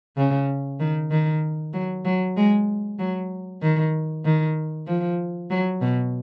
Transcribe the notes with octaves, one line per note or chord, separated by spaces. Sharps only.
C#3
D#3
D#3
F#3
F#3
G#3
F#3
D#3
D#3
F3
F#3
B2